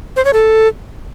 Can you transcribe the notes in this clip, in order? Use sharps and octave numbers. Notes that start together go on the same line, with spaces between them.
C5
C#5
A4